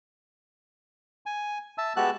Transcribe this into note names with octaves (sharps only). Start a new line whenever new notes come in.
G#5
E5 A5 E6
G#3 B3 F#4 G4 A5 F#6